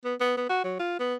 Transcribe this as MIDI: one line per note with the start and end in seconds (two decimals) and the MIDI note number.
0.05 0.14 59
0.20 0.33 59
0.37 0.48 59
0.50 0.61 66
0.64 0.78 54
0.80 0.97 65
1.00 1.15 59